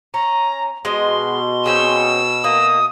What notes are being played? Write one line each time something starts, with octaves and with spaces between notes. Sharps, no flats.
C#4 A#5
B2 G#3 D#5 C6
C4 C#4 G#4 E6
A3 A#3 D#6